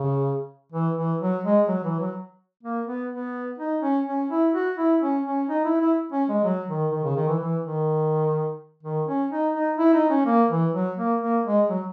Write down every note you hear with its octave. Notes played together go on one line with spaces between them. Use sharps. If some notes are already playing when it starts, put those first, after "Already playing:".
Already playing: C#3
E3
E3
F#3
G#3
F#3
E3
F#3
A#3
B3
B3
D#4
C#4
C#4
E4
F#4
E4
C#4
C#4
D#4
E4
E4
C#4
G#3
F#3
D#3
D#3
C#3
D#3
E3
E3
D#3
D#3
C#4
D#4
D#4
E4
D#4
C#4
A#3
E3
F#3
A#3
A#3
G#3
F#3